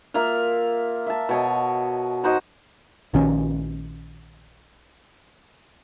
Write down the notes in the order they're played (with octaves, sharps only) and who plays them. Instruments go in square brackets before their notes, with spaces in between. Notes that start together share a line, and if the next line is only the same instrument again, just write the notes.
[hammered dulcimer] A#3 F4 E5 F5
E5 A5
B2 C#5 D#5
D#4 F#4 C5 D#5
[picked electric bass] A#1 D#3 C#4